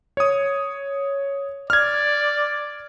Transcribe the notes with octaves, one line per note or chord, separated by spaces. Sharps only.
C#5 D#6
D5 F6 G#6